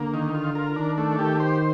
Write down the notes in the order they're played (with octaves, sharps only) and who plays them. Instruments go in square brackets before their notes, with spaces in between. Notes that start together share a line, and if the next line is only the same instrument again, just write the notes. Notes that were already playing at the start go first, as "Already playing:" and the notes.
Already playing: [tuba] D3 [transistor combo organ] A#3
[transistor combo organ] D#3
F4
A#4
[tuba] D#3 [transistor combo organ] D4
[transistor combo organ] A3
[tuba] D#3 [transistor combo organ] G4
[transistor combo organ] C5